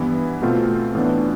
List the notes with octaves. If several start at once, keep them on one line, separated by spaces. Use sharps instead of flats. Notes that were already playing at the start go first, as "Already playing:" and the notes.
Already playing: G2 E3 B3 E4
B2 A3 C4 F4
A2 E3 B3 D4